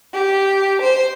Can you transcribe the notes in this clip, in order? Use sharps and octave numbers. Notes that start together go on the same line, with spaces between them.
G4
C5